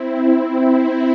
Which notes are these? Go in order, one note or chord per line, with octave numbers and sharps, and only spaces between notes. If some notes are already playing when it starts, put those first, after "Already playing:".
Already playing: C4 E4